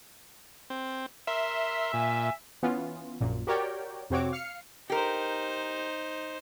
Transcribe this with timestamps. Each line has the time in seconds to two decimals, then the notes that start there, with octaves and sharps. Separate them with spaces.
0.70 C4
1.27 A#4 E5 C6
1.93 A#2 G#5
2.63 E3 B3 C#4 F4
3.21 A#1 F#2 A#2
3.47 F#4 G4 A#4 C#5 D5 G5
4.10 F2 C3 C4 F#4 C#5 D6
4.32 F5 F6 C7 C#7
4.90 D#4 G4 A#4 C5